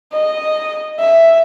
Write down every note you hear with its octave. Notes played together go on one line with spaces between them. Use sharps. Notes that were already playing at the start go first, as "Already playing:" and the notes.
D#5
E5